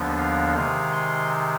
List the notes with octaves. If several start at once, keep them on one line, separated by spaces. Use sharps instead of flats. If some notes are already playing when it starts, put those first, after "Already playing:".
Already playing: D#2 D3 F3 B3 D4
F5
C3 D#3 G#3 F5
C6